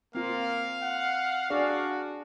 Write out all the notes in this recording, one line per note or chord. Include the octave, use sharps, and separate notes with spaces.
A#3 C4 F4 F5
F#5
D4 F#4 G#4 D5